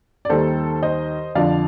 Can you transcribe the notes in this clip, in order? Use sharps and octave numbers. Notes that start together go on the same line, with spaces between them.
D5
D#2 D#3 G3 A4 C5
C5 D#5
F2 D3 F3 D5 F5